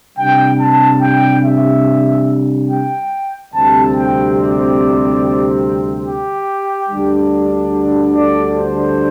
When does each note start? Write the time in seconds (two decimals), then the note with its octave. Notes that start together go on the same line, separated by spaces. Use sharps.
0.18 C3 G3 D4 G5
0.60 A5
1.02 G5
1.44 E5
2.70 G5
3.53 D2 C3 G3 C4 A5
3.95 G5
4.37 D5
6.05 G4
6.89 D2 D3 G3 D4
8.15 D5
8.56 C5